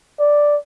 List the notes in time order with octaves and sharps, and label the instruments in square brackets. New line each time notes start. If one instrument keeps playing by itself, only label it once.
[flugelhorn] D5